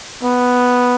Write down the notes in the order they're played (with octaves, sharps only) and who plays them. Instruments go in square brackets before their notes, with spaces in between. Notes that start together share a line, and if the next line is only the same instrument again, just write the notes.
[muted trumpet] B3